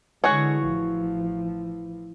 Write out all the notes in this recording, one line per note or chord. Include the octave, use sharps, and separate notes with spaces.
D3 E3 G#3 F#4 G#4 C#5
A1 F3